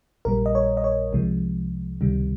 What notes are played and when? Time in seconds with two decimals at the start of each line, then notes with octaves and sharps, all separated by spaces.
0.25 A#1 A#2 G3 A#4
0.46 D#5
0.55 C#5
0.77 D#5
0.84 C#5
1.13 C2 C3 F3 G#3
2.01 C#2 C3 D#3 G3